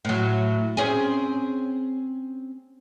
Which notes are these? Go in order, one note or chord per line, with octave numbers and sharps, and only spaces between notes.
A2 F#3
C4 C#4 G#4